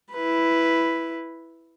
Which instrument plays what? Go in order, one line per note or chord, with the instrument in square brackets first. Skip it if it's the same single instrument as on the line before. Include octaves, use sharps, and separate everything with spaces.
[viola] E4 B4